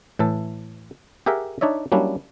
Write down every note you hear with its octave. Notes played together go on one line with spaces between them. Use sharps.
A2 E3 A4
G4 G#4 A#4 E5 F#5 G5
D4 D#4 C#5 D5 E5
F#3 G3 A#3 C#4 D4 E4